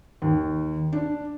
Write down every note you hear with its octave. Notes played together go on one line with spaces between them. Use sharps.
D#2
D4